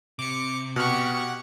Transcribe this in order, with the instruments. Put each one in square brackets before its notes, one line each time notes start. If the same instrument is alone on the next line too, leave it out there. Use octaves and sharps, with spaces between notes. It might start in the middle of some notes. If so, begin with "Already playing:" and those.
[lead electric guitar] C3 [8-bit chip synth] D6 C#7
[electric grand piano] B2 F6 [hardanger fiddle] G4 C#6 [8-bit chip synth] F#5